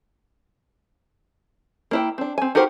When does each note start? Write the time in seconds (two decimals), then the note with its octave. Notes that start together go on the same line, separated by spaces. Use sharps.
1.91 A#3 E4 G5
2.18 C4 D4
2.38 C4 G#5
2.55 D#4 F#4 G4 A#4 C5